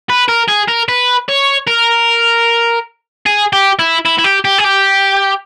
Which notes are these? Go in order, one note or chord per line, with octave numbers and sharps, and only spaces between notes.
B4
A#4
G#4
A#4
B4
C#5
A#4
G#4
G4
E4
E4
E4
G4
G4
G#4
G4